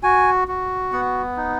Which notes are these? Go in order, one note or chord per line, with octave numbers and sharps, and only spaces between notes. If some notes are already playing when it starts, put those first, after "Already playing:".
F#4 G#5
F#4
B3 F#5
D#4